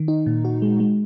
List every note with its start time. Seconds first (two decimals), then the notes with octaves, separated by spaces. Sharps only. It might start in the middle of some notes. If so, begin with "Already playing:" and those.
Already playing: D#3
0.08 D#4
0.26 A#2
0.45 F#4
0.62 G#3
0.80 G#3